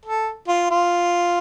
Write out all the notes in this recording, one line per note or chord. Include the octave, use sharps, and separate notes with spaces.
A4
F4
F4